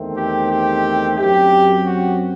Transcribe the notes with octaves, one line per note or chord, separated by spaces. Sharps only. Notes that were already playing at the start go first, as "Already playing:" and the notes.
Already playing: E2 D#3 A3 C4
G4
G4
F#2 F#3 C4 G4
F#4